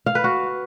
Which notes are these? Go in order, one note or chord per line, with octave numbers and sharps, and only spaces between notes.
F5
B4
F#4